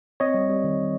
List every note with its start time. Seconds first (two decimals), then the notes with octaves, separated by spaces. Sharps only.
0.20 C4 C#5 D#5
0.34 G3
0.50 G3
0.64 D#3